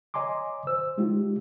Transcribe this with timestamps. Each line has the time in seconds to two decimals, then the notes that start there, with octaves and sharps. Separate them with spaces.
0.14 C#5 D#5 G#5 A#5 C6 D6
0.67 C5 E6
0.98 G#3 D#4 F4 G4